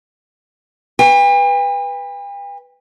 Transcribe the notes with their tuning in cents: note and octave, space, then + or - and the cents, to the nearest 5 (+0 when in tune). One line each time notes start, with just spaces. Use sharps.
B4 -5 G5 +45